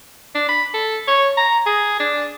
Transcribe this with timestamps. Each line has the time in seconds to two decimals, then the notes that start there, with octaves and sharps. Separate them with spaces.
0.35 D4
0.48 B5
0.74 A4
1.07 C#5
1.37 A#5
1.66 G#4
2.00 D4